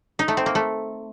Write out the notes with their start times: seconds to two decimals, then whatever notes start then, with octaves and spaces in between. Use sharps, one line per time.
0.19 D#4
0.28 A3
0.37 C4
0.46 A#3
0.55 A3